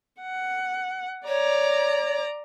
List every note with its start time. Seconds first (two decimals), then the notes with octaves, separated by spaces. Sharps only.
0.22 F#5
1.27 C#5 D5 A#5